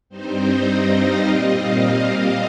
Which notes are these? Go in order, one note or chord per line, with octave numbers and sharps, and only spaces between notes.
G2 G3 C4 D#4 C5
D#5
D#5
F5
A#2 G3 C4 D#5
F5
D#5
D#5